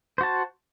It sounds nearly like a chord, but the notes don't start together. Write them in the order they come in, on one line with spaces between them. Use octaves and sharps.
C5 F#4 A5